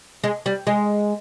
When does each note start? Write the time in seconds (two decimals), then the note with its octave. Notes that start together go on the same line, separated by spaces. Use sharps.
0.24 G#3
0.46 G3
0.67 G#3